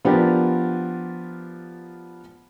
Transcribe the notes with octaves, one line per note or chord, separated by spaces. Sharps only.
F3 B3 D4 G4 A#4